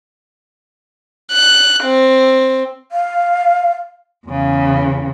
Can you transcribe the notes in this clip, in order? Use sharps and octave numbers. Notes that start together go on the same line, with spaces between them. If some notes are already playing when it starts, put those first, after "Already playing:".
F#6
C4
F5
E2 C#3